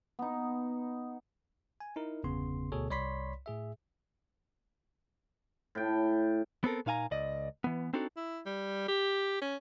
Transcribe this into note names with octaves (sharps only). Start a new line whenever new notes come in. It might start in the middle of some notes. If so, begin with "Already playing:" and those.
B3 D#4
G#5
D#4 E4 A#4
G1 E2 C#3 B3 C6
D2 B2 G#4 A4 C#5
C2 C#5 D5 B5 C6 B6
A2 G#4 E5
A2 G5
B3 C4 A4 A#4
A#2 D#4 F5 G#5 A#5
C#2 D5 D#5
E3 B3
C4 D4 D#4 F#4 A4
E4
G3
G4
C#4